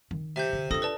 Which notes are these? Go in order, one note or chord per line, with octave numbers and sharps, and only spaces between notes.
D#3
C3 E5 G6
D3
D4 F4 A4 D#6 A#6
B4 D5 A5